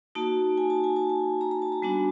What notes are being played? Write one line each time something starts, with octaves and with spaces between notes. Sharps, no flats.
A#3 D#4 F#4 A5
G#5
A5
G#5
A5
G#5
A#5
A#5
A5
A#5
G3 B3 D4 F#4 G#5